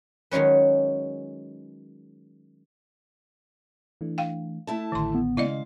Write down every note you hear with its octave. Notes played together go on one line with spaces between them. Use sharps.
D#3 F#3 G#3 C#4 B4
E3 A3 D4
F5 G5
A3 E4 A5
A1 D3 D#3 C6
B3
C#3 G#3 E4 D5 D#5 F5